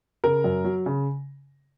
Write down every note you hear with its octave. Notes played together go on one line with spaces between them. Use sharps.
C#3 A#4
F#2
F#3
C#3